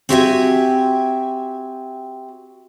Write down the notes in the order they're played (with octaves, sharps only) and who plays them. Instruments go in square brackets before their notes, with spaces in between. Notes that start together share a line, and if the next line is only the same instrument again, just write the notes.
[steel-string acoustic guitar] C4 F#4 G4 E5 F5 G#5